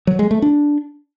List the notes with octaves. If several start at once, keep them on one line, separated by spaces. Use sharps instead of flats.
F#3
G#3
A3
D4